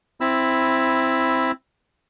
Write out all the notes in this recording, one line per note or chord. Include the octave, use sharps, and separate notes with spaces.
C4 E4 B5 E6